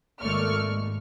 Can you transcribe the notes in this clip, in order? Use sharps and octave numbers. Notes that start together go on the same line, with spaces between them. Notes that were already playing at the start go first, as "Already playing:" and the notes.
G#1 A3 A#3 D5 C#6 F6
G#2